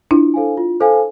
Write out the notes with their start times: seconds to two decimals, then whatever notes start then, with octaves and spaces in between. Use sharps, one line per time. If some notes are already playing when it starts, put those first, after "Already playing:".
0.11 D4 E4 F4
0.34 A4 C5 F5 G#5
0.57 F4
0.80 A4 C5 F5 G#5